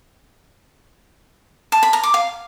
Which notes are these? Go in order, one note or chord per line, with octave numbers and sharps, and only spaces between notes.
A5
B5
A#5
D6
F5